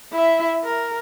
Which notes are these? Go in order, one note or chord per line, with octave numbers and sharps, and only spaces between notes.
E4 E5
A#4